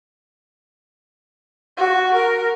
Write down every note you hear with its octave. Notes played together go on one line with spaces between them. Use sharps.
F#4
A#4